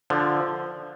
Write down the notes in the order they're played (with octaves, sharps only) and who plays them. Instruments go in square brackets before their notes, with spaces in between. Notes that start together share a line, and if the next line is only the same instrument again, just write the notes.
[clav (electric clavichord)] D3 F3